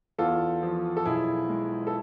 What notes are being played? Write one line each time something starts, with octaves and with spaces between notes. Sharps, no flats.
E2 F4 A4
F3
A4
B1 E4 G#4
G#3
A4